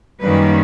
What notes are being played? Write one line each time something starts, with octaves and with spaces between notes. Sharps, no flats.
F#2 D#3 G3 A#3 C#4 B4